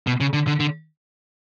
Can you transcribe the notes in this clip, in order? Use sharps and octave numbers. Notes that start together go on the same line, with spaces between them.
B2
C#3
D3
D3
D3